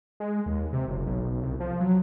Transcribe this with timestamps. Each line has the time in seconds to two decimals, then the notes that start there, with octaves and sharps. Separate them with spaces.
0.20 G#3
0.46 D#2
0.73 C3
0.88 F#1
1.06 B1
1.42 C2
1.60 F3
1.80 F#3